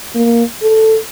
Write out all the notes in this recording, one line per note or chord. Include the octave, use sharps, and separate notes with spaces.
A#3
A4